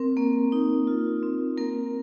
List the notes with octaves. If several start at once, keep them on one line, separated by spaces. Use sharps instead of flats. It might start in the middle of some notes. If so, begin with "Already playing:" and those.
Already playing: C4 A#4
A#3
D#4
F4
C4
A#3 A#4